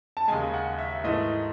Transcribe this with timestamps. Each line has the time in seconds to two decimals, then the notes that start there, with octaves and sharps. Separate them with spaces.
0.17 A5
0.28 D#2 C#3 G#3 G#5
0.54 F#5
0.78 E5
1.04 G#2 E3 A3 D#5